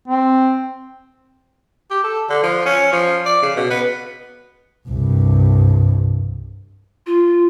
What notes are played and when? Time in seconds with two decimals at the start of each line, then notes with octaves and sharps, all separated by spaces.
0.07 C4
1.90 G4
2.03 A4
2.29 D3
2.43 F3
2.65 C#4
2.92 F3
3.25 D5
3.42 C#3
3.56 B2
3.70 B3
4.89 C2 G2
7.06 F4